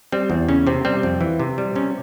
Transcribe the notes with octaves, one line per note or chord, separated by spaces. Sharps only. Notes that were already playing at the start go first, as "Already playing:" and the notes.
G3 C4
E2
C#3 C#4
C3 C4
G3 C4
F2
E3
C3
G3
C3 C#4